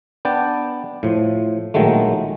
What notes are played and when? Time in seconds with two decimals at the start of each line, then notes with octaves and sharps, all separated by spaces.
0.25 B3 D4 G5 A5
1.03 A2 F3
1.74 A#1 D#3 F#3 G#3 A3